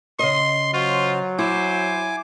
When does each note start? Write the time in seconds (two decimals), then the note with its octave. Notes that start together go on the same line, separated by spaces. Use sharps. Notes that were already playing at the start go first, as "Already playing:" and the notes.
0.19 C#3 D#5 C6
0.74 F#3 F4 F#4 C5
1.39 E4 C5 G#5 D6